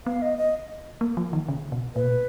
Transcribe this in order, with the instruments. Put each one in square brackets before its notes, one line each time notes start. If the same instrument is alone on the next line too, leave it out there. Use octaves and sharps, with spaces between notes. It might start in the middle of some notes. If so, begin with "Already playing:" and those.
[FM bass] B3 [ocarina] F5
[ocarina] D#5
D#5
[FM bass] A#3
F3
D#3
C#3
B2
[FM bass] A#2 [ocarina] B4
[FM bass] B2
A#2